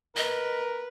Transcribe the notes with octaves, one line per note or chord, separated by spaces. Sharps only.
A#4 B4 D#5